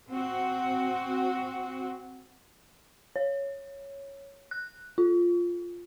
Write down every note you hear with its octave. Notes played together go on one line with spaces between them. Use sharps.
C4 F#4
C#5
F#6
F4